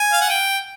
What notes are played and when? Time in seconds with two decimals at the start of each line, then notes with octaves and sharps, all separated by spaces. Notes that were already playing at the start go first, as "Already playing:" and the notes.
Already playing: G#5
0.13 F5
0.21 F#5
0.29 G5